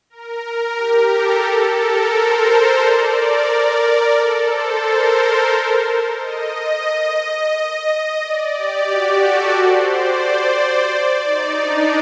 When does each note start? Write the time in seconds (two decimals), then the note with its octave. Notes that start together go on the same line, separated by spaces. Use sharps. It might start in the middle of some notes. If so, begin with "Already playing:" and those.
0.10 A#4
0.77 G4
1.11 A4
1.44 A4
1.78 A#4
2.12 C5
2.79 D5
3.13 A#4
4.15 A4
4.48 C5
4.83 A#4
5.16 C5
6.18 D#5
8.21 D5
8.54 G4
8.88 F#4
9.22 A4
9.55 C5
9.89 D5
10.24 C5
10.91 D5
11.24 D#4
11.59 D4